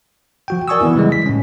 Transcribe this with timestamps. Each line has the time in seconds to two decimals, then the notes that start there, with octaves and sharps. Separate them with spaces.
0.48 F3 F#4 G5
0.68 A#4 D5 G#5 C#6 D#6 E6
0.80 E3 B3 E4
0.95 C#3 E3 G3 G#3
1.12 B6
1.26 A2 C#4